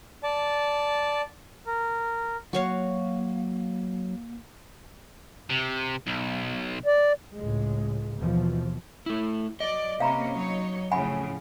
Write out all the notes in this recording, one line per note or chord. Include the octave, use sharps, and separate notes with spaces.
D5 A5
A#4
F#3 A#3 F#4 C#5 F5
C3
B1
D5
C#2 A2 G#3
D#2 B2 E3 F3
A3 E4
F#3 D5 D#5
C3 A#3 C#4 F5 A#5 B5
F#3 D#4 C#5
F2 A2 C#3 F#5 G#5 B5